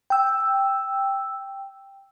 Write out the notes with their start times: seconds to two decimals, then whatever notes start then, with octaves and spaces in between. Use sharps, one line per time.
0.10 G5 E6